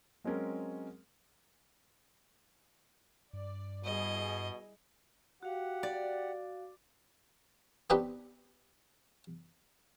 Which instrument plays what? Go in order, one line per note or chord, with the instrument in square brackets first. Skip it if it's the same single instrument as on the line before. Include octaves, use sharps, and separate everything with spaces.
[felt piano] F#3 G#3 C4 C#4 A#4
[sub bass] G2 [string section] D5
[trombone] B2 [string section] G3 E4 G#4 [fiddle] D#5
[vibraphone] F#4 F5 [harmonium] G4 F#5
[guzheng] D5
[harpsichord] B3 C4 D4 D#4 G4 B4